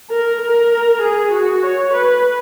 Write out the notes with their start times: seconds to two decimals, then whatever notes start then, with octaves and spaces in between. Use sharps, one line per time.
0.10 A#4
0.41 A#4
1.02 G#4
1.32 F#4
1.63 C#5
1.94 B4